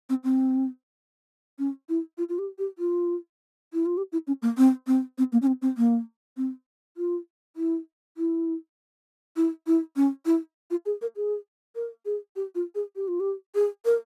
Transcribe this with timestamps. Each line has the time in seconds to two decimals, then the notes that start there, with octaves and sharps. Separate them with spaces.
0.09 C4
0.24 C4
1.59 C#4
1.89 E4
2.18 F4
2.29 F4
2.39 G4
2.58 G4
2.79 F4
3.73 E4
3.86 F4
3.97 G4
4.12 E4
4.27 C#4
4.42 A#3
4.58 C4
4.87 C4
5.18 C4
5.32 A#3
5.42 C#4
5.47 C4
5.62 C4
5.78 A#3
6.37 C4
6.97 F4
7.56 E4
8.17 E4
9.36 E4
9.67 E4
9.96 C#4
10.26 E4
10.71 F4
10.86 G#4
11.02 A#4
11.16 G#4
11.75 A#4
12.06 G#4
12.36 G4
12.55 F4
12.75 G#4
12.96 G4
13.08 F4
13.20 G4
13.55 G#4
13.85 A#4